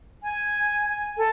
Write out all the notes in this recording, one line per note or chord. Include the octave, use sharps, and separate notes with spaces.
G#5
A4